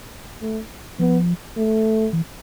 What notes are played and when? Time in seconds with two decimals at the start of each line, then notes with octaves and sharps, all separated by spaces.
0.42 A3
0.99 F3 B3
1.57 A3
2.13 E3